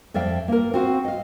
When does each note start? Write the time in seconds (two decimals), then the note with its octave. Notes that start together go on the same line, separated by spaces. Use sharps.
0.14 F2 D5 E5 F5 G5
0.48 A#3 A#4
0.74 C4 F#4 F5
1.05 D#5 F5